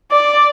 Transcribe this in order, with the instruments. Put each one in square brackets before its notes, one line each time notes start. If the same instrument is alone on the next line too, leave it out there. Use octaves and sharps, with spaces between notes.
[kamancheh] D5